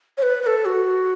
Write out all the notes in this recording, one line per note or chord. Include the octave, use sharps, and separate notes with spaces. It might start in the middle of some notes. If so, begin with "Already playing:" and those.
C#5
B4
B4
A4
F#4